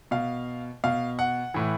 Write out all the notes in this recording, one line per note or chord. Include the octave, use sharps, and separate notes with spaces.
B2 F5
B2 F5
F#5
A2 E3